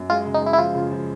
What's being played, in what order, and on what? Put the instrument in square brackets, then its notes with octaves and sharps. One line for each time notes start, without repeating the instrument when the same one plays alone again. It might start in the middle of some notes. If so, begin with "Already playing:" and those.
Already playing: [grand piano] F#2
[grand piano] G#3 [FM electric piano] F4
[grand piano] C#3
[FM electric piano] D#4
[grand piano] G#3 [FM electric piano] E4
[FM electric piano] E4
[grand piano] F3 [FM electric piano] F4
[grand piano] C#3
F3